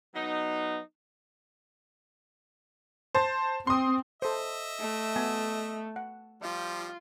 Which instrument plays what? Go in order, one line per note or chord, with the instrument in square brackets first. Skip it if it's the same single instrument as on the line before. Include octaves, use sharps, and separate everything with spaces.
[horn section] F#3 B3 D#4
[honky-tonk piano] C5 A5
[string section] C4 [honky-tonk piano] C6 D#6
[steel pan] A4 C5 [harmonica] D#5 E5
[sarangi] A3
[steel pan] B3 G#5
F#5
[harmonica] F3 G3 [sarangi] F4